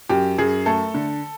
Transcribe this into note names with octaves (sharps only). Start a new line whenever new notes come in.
F#2 G4
F#2 G#4
A3 A4
D3